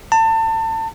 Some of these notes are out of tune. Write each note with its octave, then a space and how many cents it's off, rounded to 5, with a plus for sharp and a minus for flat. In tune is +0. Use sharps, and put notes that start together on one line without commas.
A5 +30